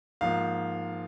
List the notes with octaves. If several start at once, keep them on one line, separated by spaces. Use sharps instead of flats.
G#2 F3 A#3 F5